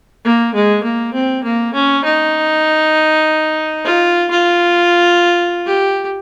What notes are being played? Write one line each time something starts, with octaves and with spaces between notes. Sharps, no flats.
A#3
G#3
A#3
C4
A#3
C#4
D#4
F4
F4
G4